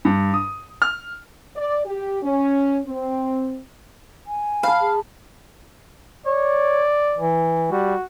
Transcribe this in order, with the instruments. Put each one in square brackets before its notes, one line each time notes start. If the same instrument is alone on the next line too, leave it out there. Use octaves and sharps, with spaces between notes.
[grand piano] G2
D#6
F6
[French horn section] D5
G4
C#4
C4
[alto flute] G#5
[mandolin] F5 [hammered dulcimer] A5 B5
[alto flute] G#4
[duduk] C#5 [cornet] D5
[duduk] E3
[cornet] G3 [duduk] F#4